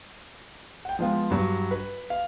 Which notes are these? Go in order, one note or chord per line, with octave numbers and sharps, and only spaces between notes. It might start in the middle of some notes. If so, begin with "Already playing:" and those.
F#5 G5
F3 G#3 B3 F4
G2 F#3
B4
F5